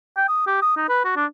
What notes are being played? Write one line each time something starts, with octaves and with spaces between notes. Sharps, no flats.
G5
D#6
G4
D#6
D#4
B4
F#4
D4